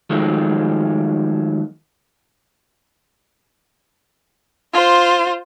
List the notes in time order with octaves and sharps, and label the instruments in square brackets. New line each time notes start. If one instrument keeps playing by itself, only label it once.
[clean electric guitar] D#3 F3 F#3 G#3 A3
[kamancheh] F4 C5